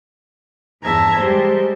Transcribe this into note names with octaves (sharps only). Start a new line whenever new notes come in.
E2 G2 E5 A5 A#5 G#6
G3 G#3 G4 C5